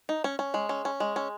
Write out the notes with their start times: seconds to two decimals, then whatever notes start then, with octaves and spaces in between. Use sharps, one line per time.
0.09 D#4
0.24 C#4
0.39 C#4
0.54 G#3
0.69 C#4
0.85 C#4
1.00 G#3
1.16 C#4